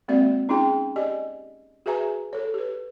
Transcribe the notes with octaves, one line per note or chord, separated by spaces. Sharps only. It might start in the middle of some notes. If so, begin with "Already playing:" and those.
G#3 A#3 C4 F#4 D5 E5
C#4 D#4 F4 G#4 G5
G4 D5 D#5 G#5
F#4 G#4 B4 E5 G#5 A#5
A4 C#5
G4 B4